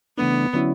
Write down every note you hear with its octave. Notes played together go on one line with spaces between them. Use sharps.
C#3 E3 A3 B3 D4
D3 F#3 C#4 E4